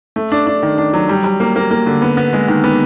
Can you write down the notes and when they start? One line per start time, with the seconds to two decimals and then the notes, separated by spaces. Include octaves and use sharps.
0.16 A3
0.32 D4
0.47 D4
0.63 D#3
0.78 D4
0.94 F#3
1.09 G3
1.24 G3
1.40 A#3
1.56 A#3
1.71 A#3
1.86 D3
2.02 B3
2.17 B3
2.33 G#3
2.48 D#3
2.64 B3